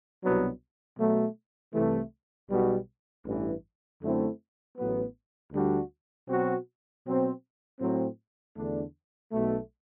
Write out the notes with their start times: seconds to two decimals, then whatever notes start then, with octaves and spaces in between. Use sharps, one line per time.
0.22 C2 B2 F#3 B3 D4
0.99 B2 F#3 A3
1.74 C2 C3 E3 A3
2.50 B1 B2 G3 B3 F#4
3.25 A1 G2 E3
4.01 F#2 D3 A3 C4 E4
4.77 A1 A2 F#3 B3
5.53 D2 D3 G3 D4 F#4
6.29 B2 F#3 C4 F#4
7.05 B2 F#3 C4
7.80 A2 F#3 C4
8.55 E2 D3 A3 D4
9.32 B1 B2 A3